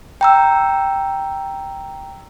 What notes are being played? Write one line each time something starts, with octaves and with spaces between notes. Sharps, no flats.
G5 A#5 E6